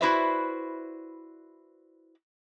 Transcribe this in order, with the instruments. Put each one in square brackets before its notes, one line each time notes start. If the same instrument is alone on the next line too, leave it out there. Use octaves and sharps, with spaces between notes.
[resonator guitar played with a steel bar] E4 F#4 B4 C5 D5 E5